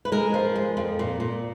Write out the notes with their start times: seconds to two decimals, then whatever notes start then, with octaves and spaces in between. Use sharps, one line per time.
0.05 B4
0.12 G#3 A#4
0.34 F3
0.55 G#3
0.77 F2
0.99 A#2
1.20 A#2